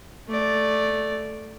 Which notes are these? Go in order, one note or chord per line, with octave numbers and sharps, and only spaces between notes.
A3 D5